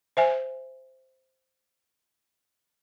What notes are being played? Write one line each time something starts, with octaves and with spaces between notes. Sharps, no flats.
C5 E5 G#5